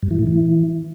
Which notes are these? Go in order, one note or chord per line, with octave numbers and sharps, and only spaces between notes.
G2
E3
A2
E3